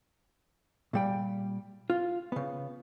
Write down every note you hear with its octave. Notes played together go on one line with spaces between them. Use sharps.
A#2 G3 G5
F4
C#3 B3